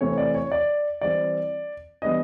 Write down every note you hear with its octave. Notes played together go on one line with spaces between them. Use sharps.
C3 E3 A3 C4 C#5
D5
C#5
D5
E3 G3 C4 D5
E3 G3 B3 D4 D#5